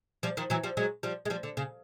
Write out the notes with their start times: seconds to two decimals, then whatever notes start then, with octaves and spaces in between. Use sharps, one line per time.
0.23 F3 G3
0.37 D#3 F3
0.50 E3 F#3
0.63 F3 G3
0.77 F#3 G#3
1.03 F3 G3
1.25 G#3
1.30 F3 G3
1.43 D3
1.57 C#3